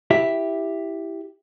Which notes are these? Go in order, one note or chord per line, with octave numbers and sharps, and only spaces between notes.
E4 G4 E5